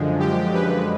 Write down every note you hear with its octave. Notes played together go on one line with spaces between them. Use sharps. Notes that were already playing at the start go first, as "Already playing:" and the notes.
Already playing: F#2 D3 F3 G#3
G4
B4